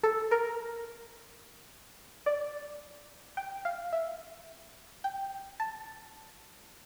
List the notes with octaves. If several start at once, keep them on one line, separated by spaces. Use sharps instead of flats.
A4
A#4
D5
G5
F5
E5
G5
A5